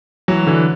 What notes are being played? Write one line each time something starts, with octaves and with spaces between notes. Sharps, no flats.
E3 F#3
D3 E3